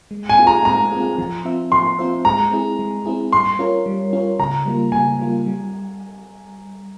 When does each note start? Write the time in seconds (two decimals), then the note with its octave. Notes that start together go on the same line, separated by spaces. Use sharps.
0.11 G#3
0.29 G#5
0.38 C4 F4 G#4
0.47 A#5
0.65 G#3 A#5
0.92 C4 F4 G#4
1.18 F3
1.45 C4 F4 C5 E5
1.72 F3 C6
1.98 C4 F4 C5 E5
2.25 G#3 A#5
2.51 C4 E4 G#4
2.79 G#3
3.06 C4 E4 G#4
3.32 G3 C6
3.59 C#4 F4 A#4 C#5
3.86 G3
4.13 C#4 F4 A#4 C#5
4.39 C#3 A#5
4.66 G3 A#3 F4
4.92 C#3 G#5
5.19 G3 A#3 F4
5.46 G3